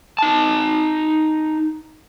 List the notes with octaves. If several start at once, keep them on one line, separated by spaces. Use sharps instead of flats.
D#4 A5